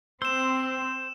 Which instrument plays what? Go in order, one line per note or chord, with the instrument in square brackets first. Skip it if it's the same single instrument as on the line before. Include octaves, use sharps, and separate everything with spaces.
[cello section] C4 [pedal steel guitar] C5 [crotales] E6 E7